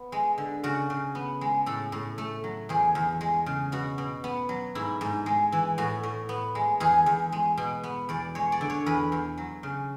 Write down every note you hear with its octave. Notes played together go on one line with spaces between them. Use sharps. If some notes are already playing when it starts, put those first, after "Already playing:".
Already playing: B3
G#3
D3
C#3 F#4
C#3
B3
G#3
A2 A4
A2
A3
F#3
E2 G#4
E2
G#3
C#3
B2 F#4
B2
B3
F#3
G#2 E4
G#2
G#3
E3
A2 F#4
A2
B3
G#3
E2 G#4
E2
G#3
B2
B3
E2 D5
G#3 C#5
D5
D3
C#5
E2 B4
E2
F#3
C#3